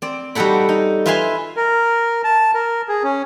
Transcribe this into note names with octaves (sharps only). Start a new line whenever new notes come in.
C4 D5
G3 D#4 F#4 A4 F#5 B5
D#4
F4 B4 E5 F5 G#5 C6
A#4
A5
A#4
G#4
C#4